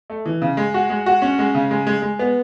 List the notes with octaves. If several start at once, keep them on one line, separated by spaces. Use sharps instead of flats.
A3
E3
C#3
G#3
F#4
G#3
F#4
C#4
G#3
C#3
G#3
G#3
G#3
B3